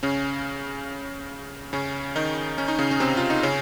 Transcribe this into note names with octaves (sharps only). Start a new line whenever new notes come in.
C#3 C#4
C#3 C#4
D#3 D#4
C#4
D#4
C#3 C#4
C#4
C3 C4
F4
D#4
C#3 C#4